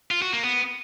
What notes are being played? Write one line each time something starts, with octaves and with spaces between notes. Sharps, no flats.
F4
F#4
A#3
B3